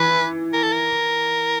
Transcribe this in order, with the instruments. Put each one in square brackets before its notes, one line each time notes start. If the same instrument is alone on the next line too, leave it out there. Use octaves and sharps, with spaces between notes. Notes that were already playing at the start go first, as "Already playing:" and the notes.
Already playing: [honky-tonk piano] E3 [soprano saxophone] B4
[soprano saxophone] A#4
A4
A#4